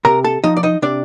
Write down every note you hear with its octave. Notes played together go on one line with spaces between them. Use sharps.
C3 A#4 A#5
A4 A5
F3 D#4 D#5
D5
D#4 D#5
C3 D4 D5